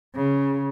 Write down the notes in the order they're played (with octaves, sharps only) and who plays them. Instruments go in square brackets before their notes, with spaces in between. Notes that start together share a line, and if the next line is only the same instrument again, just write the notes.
[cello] C#3